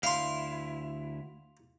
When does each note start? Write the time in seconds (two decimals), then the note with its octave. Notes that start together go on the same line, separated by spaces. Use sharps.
0.03 D2 E4 F5 C6